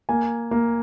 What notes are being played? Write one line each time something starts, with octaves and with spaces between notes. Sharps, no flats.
A#3 G#5
A#3